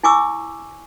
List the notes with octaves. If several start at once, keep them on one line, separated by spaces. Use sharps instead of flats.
E4 G#5 C#6 D6 E6